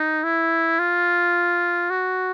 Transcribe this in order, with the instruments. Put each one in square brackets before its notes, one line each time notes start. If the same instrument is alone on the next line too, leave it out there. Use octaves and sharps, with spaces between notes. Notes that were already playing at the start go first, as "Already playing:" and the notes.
Already playing: [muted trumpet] D#4
E4
F4
F#4